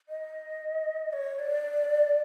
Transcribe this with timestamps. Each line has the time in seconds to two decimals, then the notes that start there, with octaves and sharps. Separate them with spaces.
0.09 D#5
1.13 C#5
1.39 D5